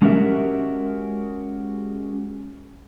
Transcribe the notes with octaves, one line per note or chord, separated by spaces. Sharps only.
G#3 C#4 F#4 G4 A#4 E5